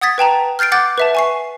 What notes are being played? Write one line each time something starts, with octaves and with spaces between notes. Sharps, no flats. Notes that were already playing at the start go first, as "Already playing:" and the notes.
F#5 D#6 G#6 A6 B6
B4 G5 A5 A#5
F6 G6 A6 C7 D7
F#5 D6 F#6 G6 A6
B4 E5 A5
G#5 C#6 C7